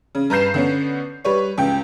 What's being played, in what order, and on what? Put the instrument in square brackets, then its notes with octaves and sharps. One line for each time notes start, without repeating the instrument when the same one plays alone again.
[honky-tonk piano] C#3
G2 B4 A#5 G6 C7 E7
D3 B3 C#4
G3 B4 C#5
C#2 G5